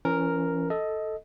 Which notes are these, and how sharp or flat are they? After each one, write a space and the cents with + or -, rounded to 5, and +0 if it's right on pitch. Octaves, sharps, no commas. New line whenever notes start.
E3 +40 C#4 +0 A#4 +0
A4 +0 D#5 +15